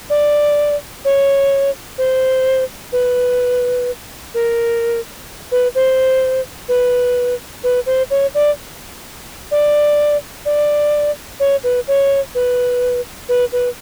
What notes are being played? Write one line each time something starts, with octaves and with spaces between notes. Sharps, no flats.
D5
C#5
C5
B4
A#4
B4
C5
B4
B4
C5
C#5
D5
D5
D5
C#5
B4
C#5
B4
B4
B4